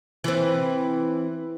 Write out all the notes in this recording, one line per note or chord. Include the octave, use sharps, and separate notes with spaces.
E3 C4